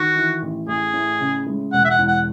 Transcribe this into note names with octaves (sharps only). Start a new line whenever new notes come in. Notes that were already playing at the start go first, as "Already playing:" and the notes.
Already playing: D#3 F#4
E3
A1
A1 G#4
A2
C#3
G#3
E1 F#5
E5
F#5
E2
F#5